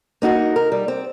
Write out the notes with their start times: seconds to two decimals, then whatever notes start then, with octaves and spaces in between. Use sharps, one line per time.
0.22 A#3 D#4 F#4 A#4
0.56 A#4
0.72 G3
0.88 C4